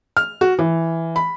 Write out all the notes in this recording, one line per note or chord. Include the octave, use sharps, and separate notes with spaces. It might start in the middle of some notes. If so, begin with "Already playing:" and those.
F6
F#4
E3
B5